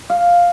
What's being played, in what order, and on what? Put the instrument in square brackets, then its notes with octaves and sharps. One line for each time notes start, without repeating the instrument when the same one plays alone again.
[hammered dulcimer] F5